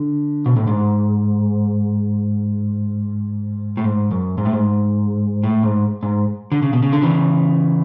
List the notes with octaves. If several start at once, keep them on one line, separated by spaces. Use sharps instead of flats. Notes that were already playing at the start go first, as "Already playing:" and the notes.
Already playing: D3
B2
A2
G#2
A2
G#2
F#2
G#2
A2
G#2
A2
G#2
G#2
D3
C#3
B2
C#3
D3
C#3 E3